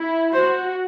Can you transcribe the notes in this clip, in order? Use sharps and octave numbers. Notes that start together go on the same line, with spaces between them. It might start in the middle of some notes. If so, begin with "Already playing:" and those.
Already playing: E4
F#4 C5